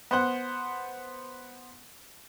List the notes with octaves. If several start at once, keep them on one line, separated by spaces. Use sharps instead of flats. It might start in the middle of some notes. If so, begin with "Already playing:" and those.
B3 C5 F#5